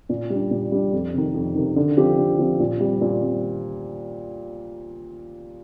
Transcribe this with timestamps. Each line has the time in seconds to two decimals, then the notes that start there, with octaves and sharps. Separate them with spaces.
0.09 A#2
0.30 G3 D4
0.51 A#2
0.72 G3 D4
0.93 F2
1.14 C3 D#3
1.34 F2
1.55 C3 D#3
1.76 D3
1.97 F3 C4 G4
2.18 D3
2.39 F3 C4 G4
2.60 A#2
2.80 G3 C4
3.01 A#2
3.22 G3 C4